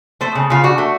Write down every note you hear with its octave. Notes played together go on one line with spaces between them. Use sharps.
A3 C5
C#3
C#3 F4
D4 F#4
A3